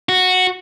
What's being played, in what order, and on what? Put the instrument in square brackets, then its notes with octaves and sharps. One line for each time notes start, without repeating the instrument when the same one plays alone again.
[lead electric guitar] F#4